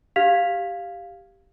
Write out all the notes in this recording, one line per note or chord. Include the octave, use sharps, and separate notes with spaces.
G4 F5 F6 G#6 B6 F7